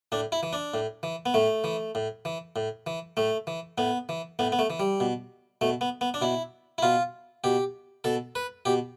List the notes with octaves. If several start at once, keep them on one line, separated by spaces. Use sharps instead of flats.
A2 D4
E4
E3
D4
A2
E3
B3
A2 A3
E3
A2
E3
A2
E3
A2 A3
E3
A2 B3
E3
A2 B3
B3
A3
E3
G3
B2
B2 A3
B3
B3
D4
B2 E4
E4
B2 F4
B2 G4
B2 A4
B4
B2 G4